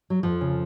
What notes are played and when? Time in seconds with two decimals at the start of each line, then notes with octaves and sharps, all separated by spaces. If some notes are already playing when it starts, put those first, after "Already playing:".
0.10 F#3
0.23 F2 F3
0.41 C#3